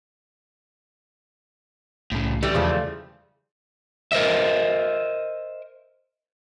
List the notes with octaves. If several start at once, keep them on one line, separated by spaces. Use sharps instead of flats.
C2 A2 C#3
E3 G3 A3
E2 C#3 F3 C4
A#4 C5 D#5 E5